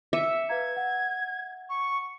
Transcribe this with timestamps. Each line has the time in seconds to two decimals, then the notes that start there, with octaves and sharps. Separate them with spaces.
0.13 E5 D6 C#7 D#7
0.49 B4 F5 A#5 G#6
0.76 F#5
1.69 C#6